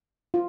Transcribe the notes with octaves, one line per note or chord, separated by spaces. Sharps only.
F4